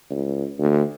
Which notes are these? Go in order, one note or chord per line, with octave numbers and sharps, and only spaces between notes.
C#2
D2